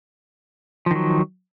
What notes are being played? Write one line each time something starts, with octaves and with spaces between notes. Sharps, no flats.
D#3 F3 F#3